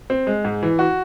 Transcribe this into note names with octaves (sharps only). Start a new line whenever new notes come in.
C4
G#3
G#2
E3
F#4